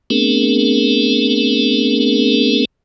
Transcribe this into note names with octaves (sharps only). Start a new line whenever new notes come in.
A3 B3 C4 D4 G#4 A#4